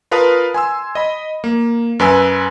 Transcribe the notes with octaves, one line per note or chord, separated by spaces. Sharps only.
F4 A#4 B4 F5 A5 D#6
G#5 C6 E6
D#5 B5
A#3
F#2 B4 G#5 E6